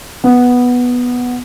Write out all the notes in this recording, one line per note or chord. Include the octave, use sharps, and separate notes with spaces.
B3